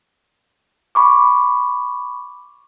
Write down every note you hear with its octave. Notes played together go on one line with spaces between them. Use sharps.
B5 C#6 D6